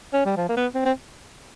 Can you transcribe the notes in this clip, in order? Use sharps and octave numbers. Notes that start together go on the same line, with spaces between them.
C#4
G3
F3
A#3
B3
C4
C4